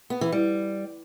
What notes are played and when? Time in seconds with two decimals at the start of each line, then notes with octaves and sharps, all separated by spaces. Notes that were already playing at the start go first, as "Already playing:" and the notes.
0.10 B3
0.21 E3
0.32 G3